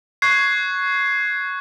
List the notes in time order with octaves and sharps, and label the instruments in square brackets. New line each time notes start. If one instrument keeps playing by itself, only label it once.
[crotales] C#6 F#6 G#6 C7